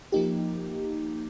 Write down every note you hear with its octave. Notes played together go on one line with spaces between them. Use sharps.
F3 A#3 D#4 G4